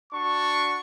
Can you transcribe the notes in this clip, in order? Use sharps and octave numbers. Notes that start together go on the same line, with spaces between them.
D4 F#4 C#6